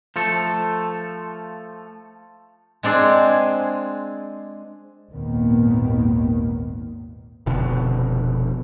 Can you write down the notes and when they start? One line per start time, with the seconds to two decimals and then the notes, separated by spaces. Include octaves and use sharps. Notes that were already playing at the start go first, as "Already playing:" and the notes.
0.16 F3 A3 A4
2.83 G#3 C4 D4 G#4
5.12 G#1 D#2 A#2 D#3 A#3 B3
7.46 F1 F2 B2 D3